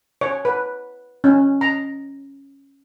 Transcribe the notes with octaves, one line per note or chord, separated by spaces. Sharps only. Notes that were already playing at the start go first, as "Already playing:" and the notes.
C#5
B4
C#4
A#5